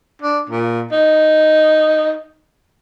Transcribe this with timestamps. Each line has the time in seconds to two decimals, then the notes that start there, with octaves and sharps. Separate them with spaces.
0.22 D4
0.49 A#2
0.92 D#4